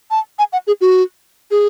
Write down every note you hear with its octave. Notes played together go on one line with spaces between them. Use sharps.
A5
G#5
F#5
G#4
F#4
G#4